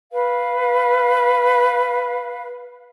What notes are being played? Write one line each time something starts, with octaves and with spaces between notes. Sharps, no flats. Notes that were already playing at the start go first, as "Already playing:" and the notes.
B4 F5